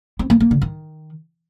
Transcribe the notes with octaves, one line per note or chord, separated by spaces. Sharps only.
C4
A#3
A#3
D3
D#3